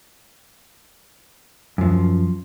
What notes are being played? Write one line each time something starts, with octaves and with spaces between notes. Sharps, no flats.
F#2 F3